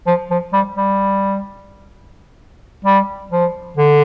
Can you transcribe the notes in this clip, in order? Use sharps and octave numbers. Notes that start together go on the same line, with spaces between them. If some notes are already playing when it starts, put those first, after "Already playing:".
F3
F3
G3
G3
G3
F3
D3